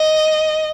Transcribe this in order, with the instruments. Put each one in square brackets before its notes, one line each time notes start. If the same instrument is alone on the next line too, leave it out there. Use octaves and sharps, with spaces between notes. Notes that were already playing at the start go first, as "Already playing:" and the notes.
Already playing: [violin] D#5